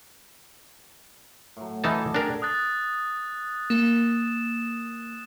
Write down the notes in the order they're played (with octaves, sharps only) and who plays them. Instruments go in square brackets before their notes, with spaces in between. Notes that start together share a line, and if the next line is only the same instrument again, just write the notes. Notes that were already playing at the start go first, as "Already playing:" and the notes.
[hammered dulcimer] A2 F#3
[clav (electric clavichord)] E3 D#4 A5 [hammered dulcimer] A4 D5
[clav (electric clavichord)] D4 A#4 [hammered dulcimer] G#4 G5
[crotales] D#6 F#6 A6
[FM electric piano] A#3 [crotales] E7